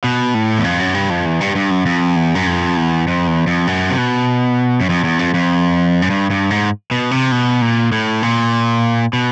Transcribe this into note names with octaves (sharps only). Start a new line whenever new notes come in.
B2
A2
E2
F2
F#2
G2
F2
E2
G2
G2
F#2
F2
E2
F#2
F2
E2
F2
E2
F2
F#2
C3
B2
F#2
F2
E2
F2
F2
F#2
G2
G2
G#2
B2
C3
B2
A#2
A2
A#2
B2